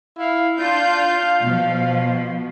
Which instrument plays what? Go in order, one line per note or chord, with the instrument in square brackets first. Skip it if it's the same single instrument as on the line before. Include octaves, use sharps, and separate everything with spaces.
[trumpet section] E4 F5
[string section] D4 F4 G6 [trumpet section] F5
[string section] B2 F3